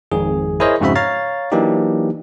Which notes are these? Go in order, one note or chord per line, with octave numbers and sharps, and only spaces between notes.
G#1 F2 G#2 G#4
E4 G#4 A#4 C5 C#5 D#5
F2 G#2 C#3 F#4 E5 B5
C#5 F5 A#5 A6
E3 F#3 A#3 D4 D#4 G4